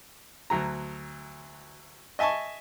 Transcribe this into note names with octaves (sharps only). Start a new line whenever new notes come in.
D2 F#3 A#5
D#5 E5 G#5 A5 C#6